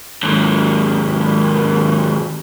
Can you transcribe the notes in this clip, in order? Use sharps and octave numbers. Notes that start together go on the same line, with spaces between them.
D#2 G#2